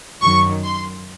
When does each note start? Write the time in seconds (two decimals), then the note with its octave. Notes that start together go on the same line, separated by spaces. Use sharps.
0.21 F#2 D#3 F#3 C#6
0.64 C6